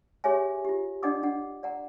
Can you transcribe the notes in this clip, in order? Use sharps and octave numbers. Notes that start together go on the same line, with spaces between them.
G4 G#4 C#5 E5 G#5
F4 G4
D4 D5 D#5 F#5 D6 D#6
D4 F#5
D5 F#5 A#5